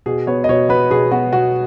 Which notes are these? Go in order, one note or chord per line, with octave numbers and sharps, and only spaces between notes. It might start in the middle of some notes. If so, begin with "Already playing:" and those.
B2 G#4
B3 C#5
D#5
B2 C#5
B3 B4
B2 G#4
B3 F#4
B2 F#4